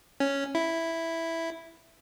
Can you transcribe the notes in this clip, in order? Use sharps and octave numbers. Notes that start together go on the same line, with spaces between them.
C#4
E4